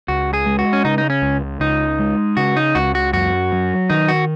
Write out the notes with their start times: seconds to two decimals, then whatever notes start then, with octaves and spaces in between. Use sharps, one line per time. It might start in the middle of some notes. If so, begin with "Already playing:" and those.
0.08 C#2 F#4
0.33 G#4
0.46 G#3
0.59 F#4
0.73 C#4
0.85 C#3 D#4
0.98 D#4
1.10 C#4
1.22 C#2
1.60 C#2 D#4
1.99 G#3
2.37 C#3 F#4
2.57 D#4
2.75 C#2 F#4
2.95 F#4
3.13 F#2 F#4
3.52 F#3
3.90 D#3 D#4
4.08 F#4